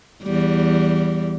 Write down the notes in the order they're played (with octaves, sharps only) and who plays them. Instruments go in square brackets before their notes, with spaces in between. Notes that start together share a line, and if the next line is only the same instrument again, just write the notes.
[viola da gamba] E2 G3